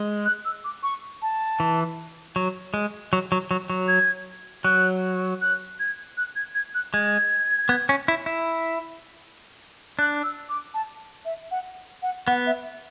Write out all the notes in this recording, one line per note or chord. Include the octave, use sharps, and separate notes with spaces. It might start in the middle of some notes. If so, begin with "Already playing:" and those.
Already playing: G#3
F#6
E6
D6
C#6
A5
E3
F#3
G#3
F#3
F#3
F#3
F#3
G#6
F#3 F#6
F#6
G#6
F#6
G#6
G#6
F#6
G#3 G#6
B3
C#4
E4
E4
D4 F#6
E6
D6
A5
E5
F#5
F#5
B3 F#5
E5